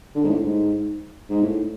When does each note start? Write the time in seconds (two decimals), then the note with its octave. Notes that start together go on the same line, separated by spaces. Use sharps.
0.15 D3
0.24 G#2
0.29 A2
0.43 G#2
1.30 G#2
1.42 A2